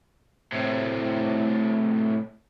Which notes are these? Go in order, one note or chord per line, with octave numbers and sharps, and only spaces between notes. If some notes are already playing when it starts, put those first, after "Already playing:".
A2 C3